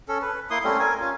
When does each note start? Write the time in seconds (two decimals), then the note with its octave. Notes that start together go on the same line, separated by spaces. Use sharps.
0.09 C#4 A4
0.22 B4
0.50 A#3 E4 C6 D#6
0.64 G3 A3 C4 C#4
0.79 A#4 G#5
1.00 C#4 F4